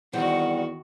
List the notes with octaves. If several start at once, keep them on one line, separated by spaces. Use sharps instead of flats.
E2 D#3 G3 C4 F#4 F#5